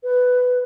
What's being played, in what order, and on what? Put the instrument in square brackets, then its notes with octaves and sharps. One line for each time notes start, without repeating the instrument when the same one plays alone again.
[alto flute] B4